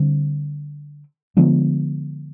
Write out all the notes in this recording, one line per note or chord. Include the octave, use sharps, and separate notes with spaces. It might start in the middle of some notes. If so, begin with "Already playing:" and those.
Already playing: D3 G3 C4
D3 F3 G#3 B3